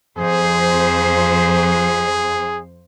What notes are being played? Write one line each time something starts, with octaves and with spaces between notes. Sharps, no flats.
F2 G#4 C5